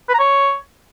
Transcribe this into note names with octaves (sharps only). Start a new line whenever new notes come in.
B4
A#5
C#5